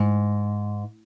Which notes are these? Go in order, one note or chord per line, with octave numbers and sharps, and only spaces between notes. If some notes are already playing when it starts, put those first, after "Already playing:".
Already playing: G#2